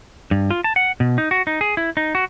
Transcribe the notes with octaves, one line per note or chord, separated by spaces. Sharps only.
G2
F4
A5
F#5
B2
D#4
F#4
D#4
G#4
E4
D#4
F#4